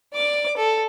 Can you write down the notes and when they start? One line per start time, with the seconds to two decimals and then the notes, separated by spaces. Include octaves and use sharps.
0.14 D5 D6
0.57 A4